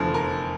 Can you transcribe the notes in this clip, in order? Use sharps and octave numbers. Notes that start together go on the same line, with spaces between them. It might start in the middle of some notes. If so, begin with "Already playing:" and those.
Already playing: F1 E2 D3 F3
A#4